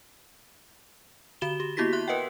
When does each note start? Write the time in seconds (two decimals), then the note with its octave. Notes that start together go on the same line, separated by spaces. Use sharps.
1.41 D3 F#4 E7 G7
1.60 G4
1.77 A#3 B3 E4 F#4 G4 B6
1.93 E5 C6 F#6
2.08 A#4 B4 D#5 F#5 G5